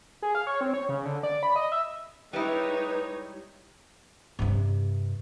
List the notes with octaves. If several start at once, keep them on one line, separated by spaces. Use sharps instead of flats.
G#4
F5
C#5
C4
C#5
C#3
D3
D5
B5
D#5
E5
G3 G#3 D#4 E4 B4 C#5
G2 C3